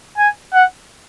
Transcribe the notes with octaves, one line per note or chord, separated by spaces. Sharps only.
G#5
F#5